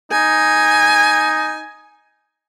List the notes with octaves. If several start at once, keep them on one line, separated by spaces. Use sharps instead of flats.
D#4 G#5